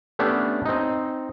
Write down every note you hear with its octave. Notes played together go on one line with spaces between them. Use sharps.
A3 B3 C#4 D4 G4
C4 D#4